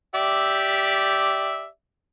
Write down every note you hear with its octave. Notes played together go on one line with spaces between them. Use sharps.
G4 D5 E5